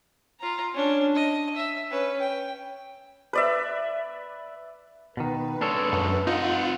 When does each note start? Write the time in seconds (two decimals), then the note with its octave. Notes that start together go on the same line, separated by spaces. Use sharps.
0.40 F4 A#5
0.73 C#4 D4
1.15 D#5
1.56 E5
1.90 C#4 B4
2.20 G5
3.33 B4 D5 E5
5.17 B2 D#3 B4
5.61 G#3 A#3 D4 A4 C#5
5.93 F#2
6.27 C4 D#4 F4 F#5